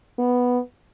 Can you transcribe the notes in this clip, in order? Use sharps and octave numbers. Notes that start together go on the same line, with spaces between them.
B3